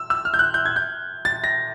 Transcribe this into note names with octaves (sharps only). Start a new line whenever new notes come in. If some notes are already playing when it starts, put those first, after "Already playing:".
Already playing: E6
E6
F6
G6
F#6
G6
G#6
G6
A6
A#6